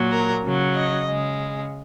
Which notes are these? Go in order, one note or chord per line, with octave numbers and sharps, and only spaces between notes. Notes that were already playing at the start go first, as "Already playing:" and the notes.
Already playing: A#2 F#3
A#4
C#3 F#3
D#5
C#3 G#3